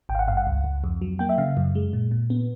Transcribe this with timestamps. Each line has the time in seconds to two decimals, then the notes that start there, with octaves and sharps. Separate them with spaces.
0.09 G#1 G5
0.15 F5
0.19 F#5
0.28 G2 F5
0.37 F#5
0.47 C#2
0.64 C#2
0.84 F2
1.02 F#3
1.19 A#3 G5
1.29 E5
1.38 C#3 F5
1.57 F#2
1.75 G#3
1.93 A#2
2.11 A#2
2.30 B3